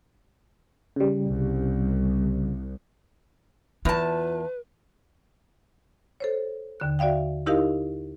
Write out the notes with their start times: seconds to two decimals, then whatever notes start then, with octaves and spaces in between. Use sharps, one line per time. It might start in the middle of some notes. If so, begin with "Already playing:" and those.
0.96 C#3 G3
1.26 C2
3.85 E2 F4 B4 A5
6.20 A4 C5 C#5
6.80 D#2 D3 F#6
6.99 F#4 D5 E5 F5 G5
7.46 D#4 E4 G4 A#4 D#5 F5